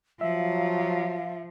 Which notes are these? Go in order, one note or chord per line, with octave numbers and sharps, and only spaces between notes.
F3 F#3 E5 F5